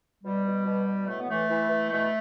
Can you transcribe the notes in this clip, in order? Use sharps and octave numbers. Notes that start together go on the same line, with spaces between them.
B2 G3
B2
B2
B2
A2 A3
B3
E3 A3
E3
E3
B2 A3